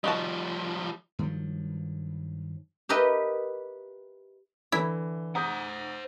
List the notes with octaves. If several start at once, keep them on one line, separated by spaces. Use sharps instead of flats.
F3 G3 D#4 F#4 A5
G2 D#3 F3 F#3
G4 A#4 B4 D#5 E5 G5
D3 E3 E4
C5 F#5 A#5 D#6 G6